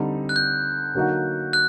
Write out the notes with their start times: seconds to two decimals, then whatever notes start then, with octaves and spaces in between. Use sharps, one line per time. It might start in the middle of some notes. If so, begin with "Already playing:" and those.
Already playing: D3 G3 C4 D#4
0.29 F#6
0.36 G6
0.95 D3 F#3 A#3 D#4 F#4
1.53 F#6